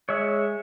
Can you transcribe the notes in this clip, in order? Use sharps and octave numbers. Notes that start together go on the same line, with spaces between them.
G#3 C#5 E5